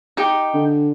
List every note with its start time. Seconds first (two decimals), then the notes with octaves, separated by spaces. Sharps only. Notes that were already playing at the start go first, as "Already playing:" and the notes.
0.17 D#4 G4
0.54 D3